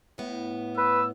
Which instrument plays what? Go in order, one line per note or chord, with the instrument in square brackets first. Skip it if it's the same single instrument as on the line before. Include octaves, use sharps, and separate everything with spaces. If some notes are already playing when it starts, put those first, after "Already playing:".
[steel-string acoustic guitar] A2 B3
[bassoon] B4 [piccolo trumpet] E6